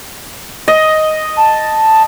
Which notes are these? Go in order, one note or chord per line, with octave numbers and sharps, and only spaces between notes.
D#5
A5